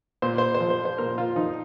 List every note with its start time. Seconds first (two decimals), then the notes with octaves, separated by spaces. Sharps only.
0.22 A#2 C5
0.38 C5
0.55 C5
0.60 F3
0.70 C5
0.85 C5
0.98 A#2 A#4
1.18 F4
1.36 F3 D#4